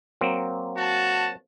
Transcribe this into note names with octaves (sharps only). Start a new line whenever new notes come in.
F#3 A#3 C4
F#4 A5